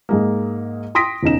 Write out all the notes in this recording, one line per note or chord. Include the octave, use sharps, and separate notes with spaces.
G#2 G#3 A#3
G5 C6 D#6 A#6 B6 D7
E1 C#3 D#4 E7